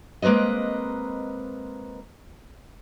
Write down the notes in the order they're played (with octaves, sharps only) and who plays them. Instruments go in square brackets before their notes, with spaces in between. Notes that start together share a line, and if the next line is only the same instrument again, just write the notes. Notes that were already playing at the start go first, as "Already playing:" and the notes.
[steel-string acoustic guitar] G#3 A#3 C4 B4 D#5